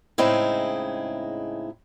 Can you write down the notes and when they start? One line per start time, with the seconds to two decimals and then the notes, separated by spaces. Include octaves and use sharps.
0.18 A2 C#3 G#3 C4 D#4 E4